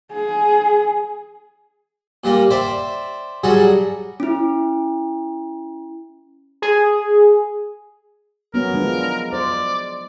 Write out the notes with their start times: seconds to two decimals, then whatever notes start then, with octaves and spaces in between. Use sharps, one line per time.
0.12 G#4
2.24 A#2 G3 A#3
2.50 C5 D5 E5 G5
3.44 F#3 G3 F#4 G#4 A4
4.20 C#4 E4
6.62 G#4
8.54 F#3 B3 C#4 A#4
8.74 F3 G#3 D4
9.32 C5 D5